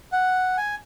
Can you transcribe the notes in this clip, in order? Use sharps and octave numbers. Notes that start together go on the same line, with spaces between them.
F#5
G#5